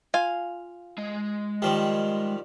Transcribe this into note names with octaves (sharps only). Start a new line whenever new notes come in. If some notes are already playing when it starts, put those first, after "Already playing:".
F4 F5 G#5
G#3 D#5
D#3 F3 G3